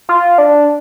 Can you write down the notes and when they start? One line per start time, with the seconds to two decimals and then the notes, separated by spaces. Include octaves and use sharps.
0.09 F4
0.38 D4